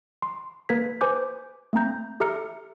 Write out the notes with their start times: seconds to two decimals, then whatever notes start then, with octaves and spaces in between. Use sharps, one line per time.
0.22 C6
0.69 A#3 A#4 B4 G#6 B6
1.01 B4 C5 G#5 D6 G6
1.73 A3 A#3 C4 A#5 G6
2.20 G4 A4 E5 A#5 F6 C#7